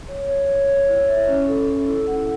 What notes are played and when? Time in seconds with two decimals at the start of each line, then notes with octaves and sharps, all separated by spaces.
0.08 C#5
0.28 C#5
0.48 C#5
0.69 C#5
0.88 E4
1.08 E5
1.28 C#4
1.48 A4
1.67 A4
1.87 E4
2.07 F#5